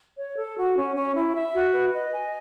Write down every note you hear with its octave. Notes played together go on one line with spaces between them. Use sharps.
C#5
A4
F#4
C#4
C#4
E4
E5
F#4
B4
D#5
G#5